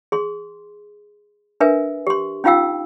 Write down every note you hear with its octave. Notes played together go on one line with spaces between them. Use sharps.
G#4 C6
D4 A#4 B4 E5 G#5
G4 C6
C#4 D#4 F4 F5 G5 E6